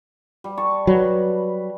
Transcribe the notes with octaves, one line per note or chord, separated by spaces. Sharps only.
G3
A5 C#6
F#3 B4